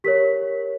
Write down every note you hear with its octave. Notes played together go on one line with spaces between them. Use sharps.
G4 A#4 C#5 B6